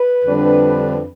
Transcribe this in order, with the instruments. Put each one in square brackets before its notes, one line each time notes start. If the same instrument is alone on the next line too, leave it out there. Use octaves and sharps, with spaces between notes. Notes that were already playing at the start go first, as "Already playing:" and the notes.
Already playing: [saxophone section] B4
F2 D3 G3 D4